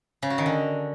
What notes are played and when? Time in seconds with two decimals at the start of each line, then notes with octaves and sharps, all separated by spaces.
0.22 C#3
0.30 F#4
0.38 D#3
0.46 D3